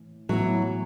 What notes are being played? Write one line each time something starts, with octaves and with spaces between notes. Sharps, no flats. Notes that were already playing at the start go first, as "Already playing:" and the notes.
Already playing: A2 E3
A2 E3 F#3 B3 E4